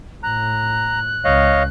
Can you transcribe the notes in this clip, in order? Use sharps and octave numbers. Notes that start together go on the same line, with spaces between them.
A2 A#5 F#6
C#2 C#5 D#5 F5